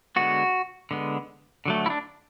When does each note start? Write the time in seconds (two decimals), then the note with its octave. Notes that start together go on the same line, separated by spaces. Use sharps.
0.16 D3 G#3 B3 F#4
0.91 D3 G#3 B3
1.66 D3 F#3 A3
1.86 E4
1.90 D4